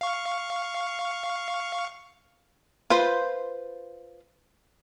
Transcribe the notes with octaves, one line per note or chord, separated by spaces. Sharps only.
F5 C#6
F4 B4 C5 B5